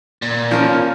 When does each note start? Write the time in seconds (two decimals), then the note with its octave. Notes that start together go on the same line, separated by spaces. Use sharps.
0.22 A#2
0.51 F3 C#4 A#4